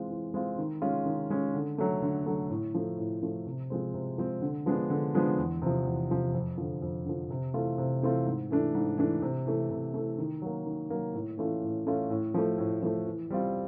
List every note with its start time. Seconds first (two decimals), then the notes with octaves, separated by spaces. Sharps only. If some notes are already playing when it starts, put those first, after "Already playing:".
Already playing: E3 G#3 C4 F4
0.10 E3
0.34 G#3 C4 F4
0.58 D#3
0.82 G#3 C#4 F4
1.06 D#3
1.30 G#3 C#4 F4
1.54 D3
1.78 F#3 A3
2.02 D3
2.26 F#3 A3
2.50 A2
2.75 F3 A3
2.98 A2
3.23 F3 A3
3.46 C3
3.70 F3 G#3 C4
3.94 C3
4.18 F3 G#3 C4
4.42 D3
4.66 F3 G#3 B3 D4
4.90 D3
5.14 F3 G#3 B3 D4
5.38 E2
5.62 C3 F3
5.86 E2
6.10 C3 F3
6.34 F2
6.58 D3 F3
6.82 F2
7.06 D3 F3
7.30 C3
7.54 E3 A3 C4 F4
7.78 C3
8.03 E3 A3 C4 F4
8.26 G#2
8.50 E3 A3 D4
8.74 G#2
8.98 E3 A3 D4
9.22 C3
9.46 E3 A3
9.70 C3
9.94 E3 A3
10.18 D#3
10.42 F#3 A#3
10.66 D#3
10.90 F#3 A#3
11.14 A2
11.38 E3 A3 C#4 F4
11.62 A2
11.86 E3 A3 C#4 F4
12.10 A2
12.34 F3 A3
12.58 A2
12.82 F3 A3
13.06 E3
13.30 G3 C4 F4